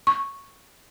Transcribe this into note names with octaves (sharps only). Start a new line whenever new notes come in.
C#6